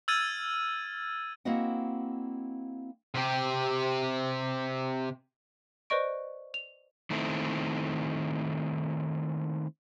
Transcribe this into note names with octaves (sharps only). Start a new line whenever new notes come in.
E6 F6 G#6 A6 D#7
A#3 C4 E4 F#4 D#5 F#5
C3 G4
B4 C5 D5 D#5 C#6 D7
F7
D#3 A3 C4 E4